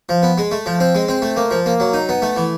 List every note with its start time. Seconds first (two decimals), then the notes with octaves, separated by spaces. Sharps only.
0.09 F3
0.23 B3
0.38 G#3
0.51 A3
0.66 F3
0.80 C4
0.95 G#3
1.08 C4
1.22 A3
1.36 A#3
1.51 F3
1.66 A#3
1.80 F#3
1.93 D#4
2.09 B3
2.22 A3
2.36 E3